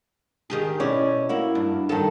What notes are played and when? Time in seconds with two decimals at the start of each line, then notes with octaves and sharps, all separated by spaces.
0.50 D#3 G4 G#4
0.80 B2 C#4 E4 D5
1.29 A#3 E4 F#4
1.55 G2
1.89 G2 D#3 A4